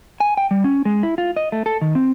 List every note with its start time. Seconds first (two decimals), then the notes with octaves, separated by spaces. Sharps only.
0.20 G#5
0.37 G5
0.51 G3
0.64 C#4
0.85 G#3
1.03 E4
1.18 F4
1.36 D#5
1.52 A3
1.66 A4
1.81 D#3
1.95 C4